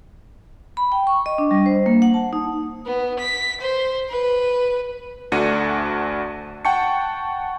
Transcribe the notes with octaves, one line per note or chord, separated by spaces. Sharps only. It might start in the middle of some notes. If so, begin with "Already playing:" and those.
B5
G5
C#6
D#5
D4
G3
C5
A#3
F#5
A5
D#4
B3
B6
C5
B4
D2 A3 D4 F#4 C#7 D#7
F#5 G5 A5 C#6 C#7